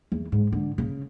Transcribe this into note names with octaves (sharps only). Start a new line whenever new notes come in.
E2
G#2
D3
C#3